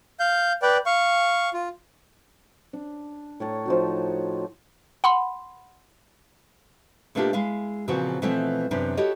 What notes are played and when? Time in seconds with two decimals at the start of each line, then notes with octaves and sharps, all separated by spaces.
0.20 F5 G6
0.62 B4 D5 G5
0.86 F5 C#6
1.54 F4
2.73 D4
3.40 A2 C#5 A5 A#5
3.66 F3 D#4 F#4
5.04 F#5 B5 C6
7.15 B2 A3 A#3 D4 F4 G4
7.33 G#3 E4 F5
7.88 A#2 C#3 E3 F3 C4 F#4
8.22 B2 E3 F3 A3 C4 E4
8.71 F#2 C3 E3 B3 D4
8.97 E4 F#4 G4 A4 C#5 D#5